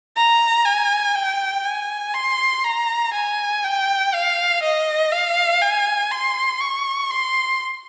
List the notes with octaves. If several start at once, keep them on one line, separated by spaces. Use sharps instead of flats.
A#5
G#5
G5
G#5
C6
A#5
G#5
G5
F5
D#5
F5
G#5
C6
C#6
C6